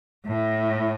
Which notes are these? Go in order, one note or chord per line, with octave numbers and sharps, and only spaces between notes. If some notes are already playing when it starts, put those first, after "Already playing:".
A2